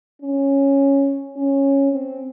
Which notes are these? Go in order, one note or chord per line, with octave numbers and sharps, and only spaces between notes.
C#4
C#4
C4